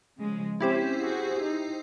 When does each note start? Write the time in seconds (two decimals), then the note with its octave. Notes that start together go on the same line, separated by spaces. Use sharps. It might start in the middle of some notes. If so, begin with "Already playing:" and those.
0.17 C#3 F3 G#3
0.60 C4 C#4 E4 G4 C5
1.01 F#4 G#4
1.45 D#4